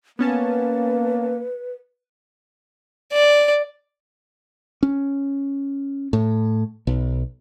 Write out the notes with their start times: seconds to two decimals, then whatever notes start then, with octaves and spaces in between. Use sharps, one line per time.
0.19 A#3 B3 C#4 B4 A5
3.13 D5
4.83 C#4
6.13 A2
6.87 B1